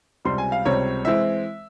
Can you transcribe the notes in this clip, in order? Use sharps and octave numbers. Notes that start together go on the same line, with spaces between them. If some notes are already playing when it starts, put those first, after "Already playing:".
C#2 C3 G3 C4 C6
G#5
F5
C#2 C3 G3 C4 C#5
E3 G#3 C4 E5